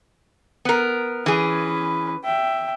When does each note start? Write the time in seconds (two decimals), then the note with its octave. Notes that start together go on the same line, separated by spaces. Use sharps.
0.65 B3 A#4
1.26 E3 C#4 G#4 B4
2.25 E5 G5